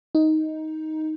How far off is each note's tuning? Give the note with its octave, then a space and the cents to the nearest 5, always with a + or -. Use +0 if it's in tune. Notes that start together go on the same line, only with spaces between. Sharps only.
D#4 +10